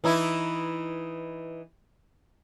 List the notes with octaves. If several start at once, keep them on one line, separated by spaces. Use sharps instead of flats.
E3 D#4 E4